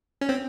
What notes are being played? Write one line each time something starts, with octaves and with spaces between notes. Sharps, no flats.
C#4
C4